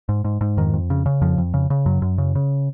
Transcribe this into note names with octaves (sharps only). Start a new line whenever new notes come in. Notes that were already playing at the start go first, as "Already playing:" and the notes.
G#2
G#2
G#2
F2 D#3
F2
C#3
C#3
F2 F3
F2
C#3
C#3
F#2 F#3
F#2
C#3
C#3